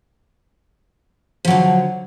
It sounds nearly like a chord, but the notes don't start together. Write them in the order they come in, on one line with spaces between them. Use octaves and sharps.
F3 F#3 D3